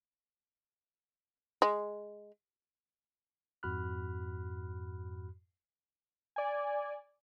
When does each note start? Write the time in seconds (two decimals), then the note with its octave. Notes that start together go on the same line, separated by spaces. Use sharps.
1.62 G#3
3.63 F2 G#2 F#4 B5 F6 F#6
6.36 D5 G#5